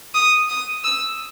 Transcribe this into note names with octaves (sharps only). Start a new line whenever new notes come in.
D#6
D#6
E6